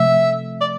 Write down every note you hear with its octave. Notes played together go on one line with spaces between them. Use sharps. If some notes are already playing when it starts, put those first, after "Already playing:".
Already playing: C3 F3 A3 E5
D5